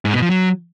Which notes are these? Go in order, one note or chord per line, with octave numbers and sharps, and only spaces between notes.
G#2
B2
F3
F#3